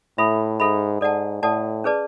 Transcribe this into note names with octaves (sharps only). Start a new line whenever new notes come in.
A2 A4 E5 B5
G#2 A4 E5 B5
G#2 A4 D5 F#5 A5
A2 A4 D5 F#5 A5
C#4 G#4 B4 D5 A5